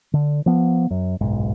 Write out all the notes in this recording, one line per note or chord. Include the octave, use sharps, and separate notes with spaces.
D3
F3 B3
F#2
F#1 B1 G#2